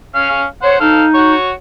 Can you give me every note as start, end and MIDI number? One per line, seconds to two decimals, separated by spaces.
0.15 0.44 61
0.15 0.44 77
0.63 0.77 72
0.63 0.77 73
0.63 0.77 78
0.80 1.34 63
0.80 1.04 69
0.80 1.04 77
1.14 1.51 66
1.14 1.51 73